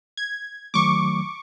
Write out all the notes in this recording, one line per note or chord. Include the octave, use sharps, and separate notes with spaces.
G#6
D#3 F#3 A3 C#6 D6